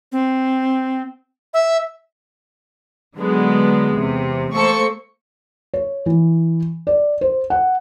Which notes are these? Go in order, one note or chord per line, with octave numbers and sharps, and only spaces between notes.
C4
E5
D3 F#3 G#3 B3
E2 C3
A3 A#3 A4 C5 C#6 C#7
C#5
E3
D5
C5
F#5